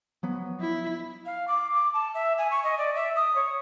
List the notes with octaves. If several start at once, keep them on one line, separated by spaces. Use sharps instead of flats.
F3 F#3 B3
E4
F5
D6
D6
A5
E5
G#5
C#6
D#5
D5
E5
D#6
C#5